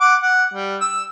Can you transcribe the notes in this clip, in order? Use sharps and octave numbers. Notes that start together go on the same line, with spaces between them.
F#5 D6
F#5
G3
E6